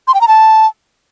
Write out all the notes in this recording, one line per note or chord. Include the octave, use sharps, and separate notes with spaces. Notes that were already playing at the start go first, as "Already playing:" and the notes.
C6
G5
A#5
A5